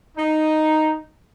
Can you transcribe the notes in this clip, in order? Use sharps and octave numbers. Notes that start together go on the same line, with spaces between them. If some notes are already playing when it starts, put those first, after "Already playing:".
D#4